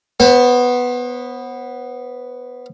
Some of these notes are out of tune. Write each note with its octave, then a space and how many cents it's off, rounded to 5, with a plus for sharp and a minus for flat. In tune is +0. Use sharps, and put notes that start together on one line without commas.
B3 +0 C5 +35